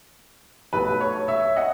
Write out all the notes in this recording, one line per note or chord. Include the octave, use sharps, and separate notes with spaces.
B1 B2 A3 B4
C#5
C#5 E5
D#5 F#5